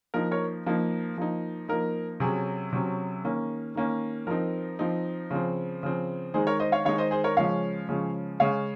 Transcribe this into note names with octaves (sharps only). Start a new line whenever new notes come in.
F3 A#3 D#4 A#4
A#4 C#5
F3 A#3 D#4
F3 A#3 D#4
F3 A#3 D#4 A#4
C3 F#3 C#4 G#4
C3 F#3 C#4
D#3 A#3 C#4
D#3 A#3 C#4
F3 C4 D#4 A#4
F3 C4 D#4
C#3 F3 C4
C#3 F3 C4
D#3 G#3 D#4 G#4 C5
A#4 C#5
C5 D#5
C#5 F5
D#3 G#3 D#4 C#5 F5
C5 D#5
G#4 C5
A#4 C#5
C#3 F3 G#3 C#4 C#5 F5
C#3 F3 G#3 C#4
C#3 G#3 C#4 C#5 F5